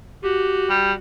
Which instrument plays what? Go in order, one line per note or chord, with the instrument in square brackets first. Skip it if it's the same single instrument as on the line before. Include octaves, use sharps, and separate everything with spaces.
[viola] F#4 [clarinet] G4
[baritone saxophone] G3